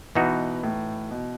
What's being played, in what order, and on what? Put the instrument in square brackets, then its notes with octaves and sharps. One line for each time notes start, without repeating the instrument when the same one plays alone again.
[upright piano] B2 [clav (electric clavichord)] E3 B3 D#4 F#4
[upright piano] A2
B2